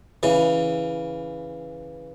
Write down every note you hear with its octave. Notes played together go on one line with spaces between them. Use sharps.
C#3 E3